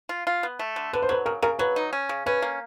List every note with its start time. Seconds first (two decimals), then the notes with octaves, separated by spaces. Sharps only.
0.09 F4
0.27 F4
0.43 B3
0.59 A3
0.76 D3
0.93 D3 B4
1.02 C5
1.09 F#3 B4
1.26 C#3 A#4
1.42 C#3 A#4
1.59 F#3 B4
1.76 D#4
1.93 C#4
2.09 C#3
2.26 C#4 B4
2.42 A#3